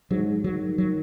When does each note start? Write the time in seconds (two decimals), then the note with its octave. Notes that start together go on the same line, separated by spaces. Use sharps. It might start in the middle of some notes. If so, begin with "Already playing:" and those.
0.11 G#2 F#3
0.44 D#3 F#3
0.78 F#3